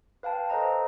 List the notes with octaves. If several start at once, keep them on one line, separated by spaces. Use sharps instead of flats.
B4 F5 G5 A5
A4 B4 C5 D#5 A#5